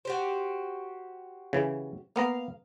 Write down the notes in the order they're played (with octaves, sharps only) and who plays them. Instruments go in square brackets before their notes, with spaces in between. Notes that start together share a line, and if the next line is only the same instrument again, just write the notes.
[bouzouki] F#4 G4 C5
[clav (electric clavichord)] C#3 E3
[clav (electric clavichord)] A#3 B3 A#5 [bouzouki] F5